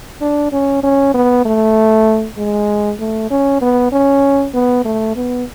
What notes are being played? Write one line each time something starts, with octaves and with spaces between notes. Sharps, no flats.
D4
C#4
C#4
B3
A3
G#3
A3
C#4
B3
C#4
B3
A3
B3